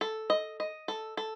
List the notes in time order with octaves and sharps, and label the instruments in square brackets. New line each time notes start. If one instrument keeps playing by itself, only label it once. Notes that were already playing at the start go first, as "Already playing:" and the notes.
[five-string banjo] A4
D#5
D#5
A4
A4